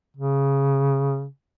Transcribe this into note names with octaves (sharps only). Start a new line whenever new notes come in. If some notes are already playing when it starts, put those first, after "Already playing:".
C#3